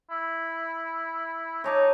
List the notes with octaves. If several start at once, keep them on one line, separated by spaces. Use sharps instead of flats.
E4
D#4 C#5 A5 D6